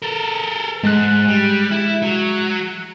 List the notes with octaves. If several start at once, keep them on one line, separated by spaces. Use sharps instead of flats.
A4 A#4
G#2 G#3 F#6
G3
E4
F#3